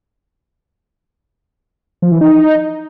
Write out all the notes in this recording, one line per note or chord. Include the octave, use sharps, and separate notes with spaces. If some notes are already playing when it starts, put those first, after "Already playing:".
F3
E3
D#4